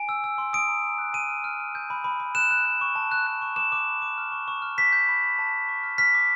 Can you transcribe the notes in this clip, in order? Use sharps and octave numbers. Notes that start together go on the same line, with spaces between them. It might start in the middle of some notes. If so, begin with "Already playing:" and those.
Already playing: G#5 D7
E6
E6
C6
D#6 D7
A#5
A#5
F#6
G#5 D#7
F6
F6
F6
G6
B5
B5
B5
F#6 E7
F#6
F#6
C#6
A5
F#6
F#6
C#6
D6 E7
D6
B5
D6
F6
C#6
C#6
F6
G6 B6
G6
B5
B5
A5
A5
C#6
F6
F6 B6
D6